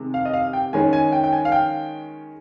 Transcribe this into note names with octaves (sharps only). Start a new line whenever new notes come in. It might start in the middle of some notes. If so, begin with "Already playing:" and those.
Already playing: C3 D#3 G#3
F5
D#5
F5
G5
D#3 G#3 C#4 G#5
G#5
G5
G5
G#5
F5
G5